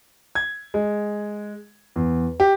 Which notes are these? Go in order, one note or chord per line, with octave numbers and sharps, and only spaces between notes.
G#6
G#3
E2
G4